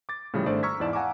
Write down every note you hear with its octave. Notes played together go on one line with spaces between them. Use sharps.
D6 A6
A2 C#3 F3 G3
G#1 A3 D4 C5 D5
A#5 C#6 E6 F6 G#6 B6
E2 G#2 E4 D5 A5 E7
F5 F#5 G#5 A#5 C#6 D6